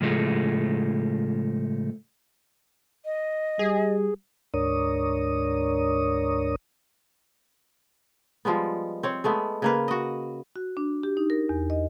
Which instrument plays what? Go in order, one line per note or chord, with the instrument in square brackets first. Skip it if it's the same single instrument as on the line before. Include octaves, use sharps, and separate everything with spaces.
[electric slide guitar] A2 C#3 F3 G#3 A3
[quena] D#5
[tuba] G3 [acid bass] G#4
[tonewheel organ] D2 G#2 D4 A#4 C#5 D#6
[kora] F3 G3 G#3 B3
C4 C#5
G#3 A3 B3
C#3 A#3 B4
F#4 D#5
[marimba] F#4
D4
G4
D#4
A#4
E2
D#5